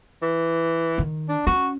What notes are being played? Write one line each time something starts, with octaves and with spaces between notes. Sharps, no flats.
E3
D#3
D4
C#4 F#4